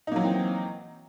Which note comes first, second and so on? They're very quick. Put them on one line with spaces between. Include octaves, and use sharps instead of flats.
D#4 A#3 F#3 E3 C4